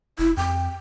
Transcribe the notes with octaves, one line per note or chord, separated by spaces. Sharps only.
F1 E4
F2 G5